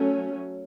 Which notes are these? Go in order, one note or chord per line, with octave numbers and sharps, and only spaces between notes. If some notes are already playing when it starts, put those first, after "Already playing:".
Already playing: F#3 A3 C#4